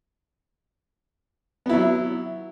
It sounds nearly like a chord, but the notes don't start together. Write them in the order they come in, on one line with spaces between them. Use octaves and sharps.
B3 E4 F#3